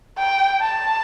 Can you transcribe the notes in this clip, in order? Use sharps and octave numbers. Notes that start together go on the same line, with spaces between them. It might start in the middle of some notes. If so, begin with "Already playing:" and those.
G5
A5